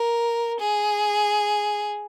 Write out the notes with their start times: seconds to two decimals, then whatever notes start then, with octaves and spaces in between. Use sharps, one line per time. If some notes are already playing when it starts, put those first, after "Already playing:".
Already playing: A#4
0.60 G#4